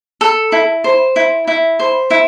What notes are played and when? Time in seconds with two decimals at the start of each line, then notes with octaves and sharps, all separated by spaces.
0.21 A4
0.52 E4
0.84 C5
1.16 E4
1.47 E4
1.79 C5
2.11 E4